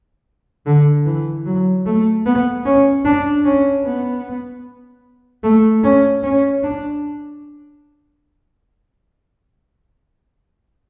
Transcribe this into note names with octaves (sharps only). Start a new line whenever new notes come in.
D3
E3
F#3
A3
B3
C#4
D4
C#4
B3
A3
C#4
C#4
D4